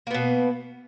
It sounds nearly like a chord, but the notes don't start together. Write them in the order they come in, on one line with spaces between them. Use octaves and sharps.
A#3 B3 B2